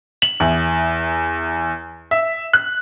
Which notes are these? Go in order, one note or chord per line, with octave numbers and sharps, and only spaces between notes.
F#7
E2
E5
F#6